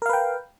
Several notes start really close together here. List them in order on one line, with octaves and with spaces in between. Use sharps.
A#4 F5 B4 G5